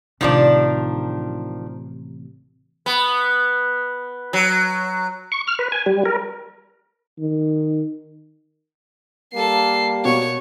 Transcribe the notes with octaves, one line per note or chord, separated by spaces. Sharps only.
A1 C3 D#3 F3 D4
B3
F#3
C#6
F6
B4
G#5
G3
A#4
D#3
G3 A#3 A4 C7
B2 C#5